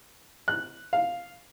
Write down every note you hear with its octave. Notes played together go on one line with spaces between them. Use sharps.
F#6
F5